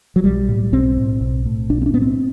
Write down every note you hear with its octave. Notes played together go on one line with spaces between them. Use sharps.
F#3
B1 G3
A2
B1 C4
A2
B1
A2
B1 D4
C4
D4
A2 B3
C4